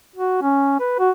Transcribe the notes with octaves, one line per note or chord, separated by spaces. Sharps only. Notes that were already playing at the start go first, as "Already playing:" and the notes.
F#4
C#4
B4
F#4